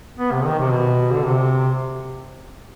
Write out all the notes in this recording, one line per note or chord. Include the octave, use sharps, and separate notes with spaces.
B3
C3
D#3
C3
B2
D3
C3